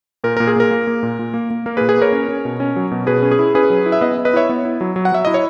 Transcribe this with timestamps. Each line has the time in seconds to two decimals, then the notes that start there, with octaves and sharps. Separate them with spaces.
0.24 A#2 A#4
0.37 A#2 A#4
0.47 G#4
0.56 A#2 A#4
0.71 A#3
0.87 A#3
1.03 A#2
1.19 A#2
1.34 A#3
1.51 A#3
1.66 A#3 A#4
1.77 G#4 B4
1.81 A#2
1.89 G#4 B4
1.97 A#3 A#4 C#5
2.12 C#4
2.29 C#4
2.45 B2
2.60 C#4
2.76 F#3
2.91 B2
3.07 B2 G#4 B4
3.22 C#4
3.31 G#4
3.39 E4
3.54 C#4 G#4 B4
3.70 F#3
3.86 E4
3.92 E5
4.01 B3 B4 D#5
4.18 B3
4.25 B4 D#5
4.34 E4 C#5 E5
4.49 B3
4.65 E4
4.81 F#3
4.96 F#3
5.05 F#5
5.12 F#3 E5
5.25 E4 D#5
5.34 C#5